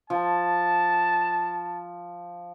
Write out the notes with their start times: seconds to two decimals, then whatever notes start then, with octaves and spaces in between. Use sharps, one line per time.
0.10 F3 A5